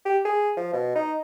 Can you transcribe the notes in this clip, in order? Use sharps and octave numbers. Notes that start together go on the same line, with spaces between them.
G4
G#4
F3
B2
D#4